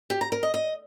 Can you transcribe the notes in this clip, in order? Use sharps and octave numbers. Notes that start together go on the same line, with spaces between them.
G4
A#5
A#4
D#5
D#5